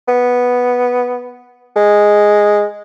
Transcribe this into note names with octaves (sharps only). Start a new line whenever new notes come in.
B3
G#3